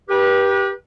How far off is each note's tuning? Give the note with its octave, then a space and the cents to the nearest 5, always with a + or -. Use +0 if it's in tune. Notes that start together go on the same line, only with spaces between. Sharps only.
G4 +0 B4 -35